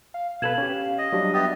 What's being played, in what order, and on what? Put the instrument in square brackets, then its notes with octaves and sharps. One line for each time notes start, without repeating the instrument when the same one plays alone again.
[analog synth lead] F5
[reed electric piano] B2 A4 B4 [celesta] G#6 E7 F#7
[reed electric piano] C#4 G4
[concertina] D#5
[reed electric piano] F#3 G3 D4 [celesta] G4
[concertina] B3 G4 D#5 [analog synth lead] E5 [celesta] D#6 A6